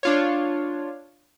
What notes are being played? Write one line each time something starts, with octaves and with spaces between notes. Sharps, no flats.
D4 F4 C#5